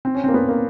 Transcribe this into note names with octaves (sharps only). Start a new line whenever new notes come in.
C4
C#4
A#3 C4
B3
A#3